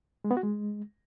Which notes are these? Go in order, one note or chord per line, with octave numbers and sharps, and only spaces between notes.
G#3
B3
F#4
G#3